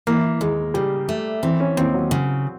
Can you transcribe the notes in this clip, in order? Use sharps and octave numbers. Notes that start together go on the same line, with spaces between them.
E3 A#3
D#2 G#3
C#3 G3
A3
E3 C4
C#4
D#2 C4
F#3
C#3 F#3